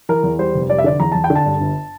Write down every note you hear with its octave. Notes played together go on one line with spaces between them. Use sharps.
E3 A#4
E2
G3 C5
F1
G3 D5
E5
D3 D5
E2 A#5
E2 A5
G5
D3
A5
G2
G1